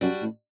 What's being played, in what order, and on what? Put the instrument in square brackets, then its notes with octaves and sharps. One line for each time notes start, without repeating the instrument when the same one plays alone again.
[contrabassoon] F#2 [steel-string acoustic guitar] G3 D4 F#4
[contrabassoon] A2